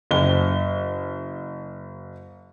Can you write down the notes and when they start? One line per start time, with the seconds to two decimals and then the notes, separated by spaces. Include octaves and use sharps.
0.11 F#1 G7